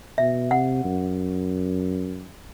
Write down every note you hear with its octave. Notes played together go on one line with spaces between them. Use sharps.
B2 E5
C3 F#5
F#2